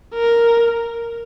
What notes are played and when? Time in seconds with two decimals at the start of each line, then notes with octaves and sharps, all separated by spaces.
0.14 A#4